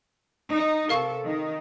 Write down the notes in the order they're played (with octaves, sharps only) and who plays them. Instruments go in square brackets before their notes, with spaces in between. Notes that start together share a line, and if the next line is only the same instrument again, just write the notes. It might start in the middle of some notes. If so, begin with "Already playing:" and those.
[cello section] D#4
[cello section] C3 A4 [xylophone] A#4 F5 C#6
[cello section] D#3 D#4